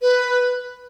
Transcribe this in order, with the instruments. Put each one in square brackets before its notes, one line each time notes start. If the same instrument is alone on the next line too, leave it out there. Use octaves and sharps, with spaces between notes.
[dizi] B4